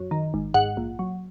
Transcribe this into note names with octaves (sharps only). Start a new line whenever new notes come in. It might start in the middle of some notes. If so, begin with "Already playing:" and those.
Already playing: F#2
D#3
G#1
G#2 F#5
A#1
F#3